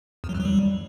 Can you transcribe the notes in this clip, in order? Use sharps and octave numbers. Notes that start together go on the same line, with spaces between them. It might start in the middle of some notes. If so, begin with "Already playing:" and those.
E2
F#3
F2
F#3
G3